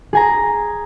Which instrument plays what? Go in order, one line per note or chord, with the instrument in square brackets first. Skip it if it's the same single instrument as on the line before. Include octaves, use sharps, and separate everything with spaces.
[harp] G#4 G#5 A#5